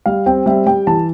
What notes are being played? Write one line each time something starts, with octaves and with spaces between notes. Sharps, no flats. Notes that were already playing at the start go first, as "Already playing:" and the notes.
G3 F5
C4 G5
G3 E5
G3 G5
E3 A5